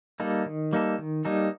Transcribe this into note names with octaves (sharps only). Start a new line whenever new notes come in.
G3 A#3 D#4 A4
D#3
G3 A#3 D#4 A4
D#3
G3 A#3 D#4 A4